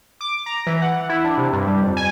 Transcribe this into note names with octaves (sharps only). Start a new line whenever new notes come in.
D6
A#5
E3
F#5
E4
D4
C3
G2
G3
F2
G#5